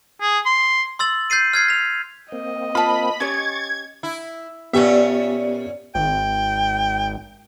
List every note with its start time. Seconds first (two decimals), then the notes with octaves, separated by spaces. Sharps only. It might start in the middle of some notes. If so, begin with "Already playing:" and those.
0.21 G#4
0.46 C6
0.99 C6 E6 A6 F#7
1.30 G6 A6 C7 D#7
1.53 F6 G#6 C7
1.68 B6 F7
2.32 A#3 C4 D#5
2.75 F4 A5 B5
3.20 C#4 G4 C#5 C#6 G#6 A6
4.03 E4
4.73 A#2 B3 C#4 G4 E5
5.95 G#1 G5